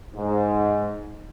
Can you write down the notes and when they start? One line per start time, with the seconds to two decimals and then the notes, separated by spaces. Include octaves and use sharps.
0.15 G#2